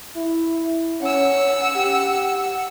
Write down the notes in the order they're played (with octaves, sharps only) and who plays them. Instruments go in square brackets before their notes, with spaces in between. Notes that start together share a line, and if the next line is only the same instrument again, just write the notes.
[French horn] E4
[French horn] C#4 [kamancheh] F#5 E6
[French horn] G4